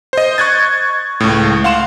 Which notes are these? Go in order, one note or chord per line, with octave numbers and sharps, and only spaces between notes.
C5 D#5
C#6 F#6 G#6 A6
C#2 A2
F5 F#5 C6 E7